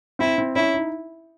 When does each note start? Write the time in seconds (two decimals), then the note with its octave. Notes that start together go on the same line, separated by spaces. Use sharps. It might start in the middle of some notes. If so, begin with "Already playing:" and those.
0.19 C4 E4
0.38 C4
0.56 C#4 E4
0.74 D#4